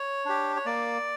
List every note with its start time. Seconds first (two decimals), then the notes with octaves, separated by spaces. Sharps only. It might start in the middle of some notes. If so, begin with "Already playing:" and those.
Already playing: C#5
0.25 D4 G4
0.56 C#5
0.66 A#3 D5